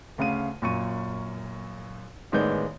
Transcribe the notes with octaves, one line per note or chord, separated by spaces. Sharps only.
D2 C#3 F5 D#7
F#2 A#2 C#6 D#7
A1 D#3 G#3 B3 D5 G6